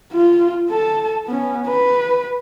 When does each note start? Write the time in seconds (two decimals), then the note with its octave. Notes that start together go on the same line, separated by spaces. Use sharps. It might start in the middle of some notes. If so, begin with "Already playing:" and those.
0.13 F4
0.70 A4 A5
1.27 B3 C#4
1.68 B4